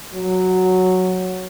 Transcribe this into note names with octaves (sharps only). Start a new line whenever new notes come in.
F#3